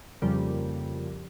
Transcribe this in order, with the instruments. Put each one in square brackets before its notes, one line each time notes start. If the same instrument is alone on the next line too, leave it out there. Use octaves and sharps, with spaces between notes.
[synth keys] F2 C#3 F3 G3 A#3